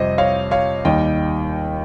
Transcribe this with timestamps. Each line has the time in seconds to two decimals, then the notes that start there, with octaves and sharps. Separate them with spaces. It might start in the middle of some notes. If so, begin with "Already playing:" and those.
Already playing: F2 C3 G3 C5 D#5
0.18 C#5 F5
0.51 C#5 F5
0.85 D#2 D#3 G3 D#5 G5